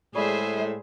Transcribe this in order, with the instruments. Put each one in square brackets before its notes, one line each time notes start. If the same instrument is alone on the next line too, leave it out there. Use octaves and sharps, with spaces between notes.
[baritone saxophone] A2 [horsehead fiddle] G#3 E5 [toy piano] G4 D5 B5 [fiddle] G#4 C5